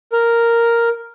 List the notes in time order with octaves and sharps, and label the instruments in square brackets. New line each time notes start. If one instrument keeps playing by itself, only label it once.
[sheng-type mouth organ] A#4